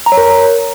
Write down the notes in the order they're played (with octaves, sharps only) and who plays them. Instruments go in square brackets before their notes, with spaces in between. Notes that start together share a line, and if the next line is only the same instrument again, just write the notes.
[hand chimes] A#5
C#5
A#4